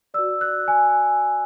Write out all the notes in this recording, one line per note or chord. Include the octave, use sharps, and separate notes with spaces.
F#4 B4 D5 E6
F#6
G#5